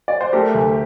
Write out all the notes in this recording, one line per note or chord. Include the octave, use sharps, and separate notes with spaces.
D5
C5
A3 G4 A#4
D2